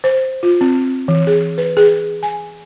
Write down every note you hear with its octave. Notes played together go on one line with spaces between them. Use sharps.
C5
F4
C4
E3
G#4
B4
G#4
G#5